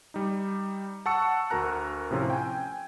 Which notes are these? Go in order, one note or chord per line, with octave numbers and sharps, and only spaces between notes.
G3 D#4
F#5 A5 C#6 E6 C#7
D2 F#4 A#4 A#5 F#6
A2 C3 F3 C#4 F4
G5 G#5